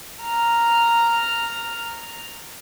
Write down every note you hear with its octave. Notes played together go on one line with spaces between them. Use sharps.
A#5 F6